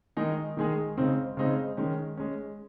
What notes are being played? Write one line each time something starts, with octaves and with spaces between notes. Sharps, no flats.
D#3 G#3 D#4 G#4
D#3 G#3 D#4 G#4
C#3 G#3 C4 D#4
C#3 G#3 C4 D#4
D#3 G#3 C#4
G#3 C#4